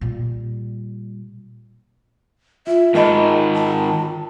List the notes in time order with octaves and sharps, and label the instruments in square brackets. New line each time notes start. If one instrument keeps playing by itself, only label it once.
[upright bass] A#2 G3
[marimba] F4 [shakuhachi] E5
[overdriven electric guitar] G#2 D#3 [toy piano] A#4 D#5 B5 [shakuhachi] A5
[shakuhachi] A5